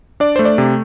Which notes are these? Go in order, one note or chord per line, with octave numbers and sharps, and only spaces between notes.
D4 D5
A3 C5
D5
C3